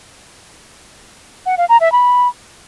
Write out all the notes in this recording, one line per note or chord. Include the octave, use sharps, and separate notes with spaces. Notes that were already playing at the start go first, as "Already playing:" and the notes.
F#5
F5
A#5
E5
B5